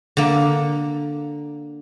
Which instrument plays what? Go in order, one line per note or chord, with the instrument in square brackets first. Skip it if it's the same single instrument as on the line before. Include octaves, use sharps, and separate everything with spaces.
[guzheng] D3 A#3